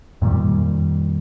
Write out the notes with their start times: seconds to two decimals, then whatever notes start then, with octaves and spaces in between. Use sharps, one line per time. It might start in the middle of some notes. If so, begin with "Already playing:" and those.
0.22 F2 A#2 D#3 G3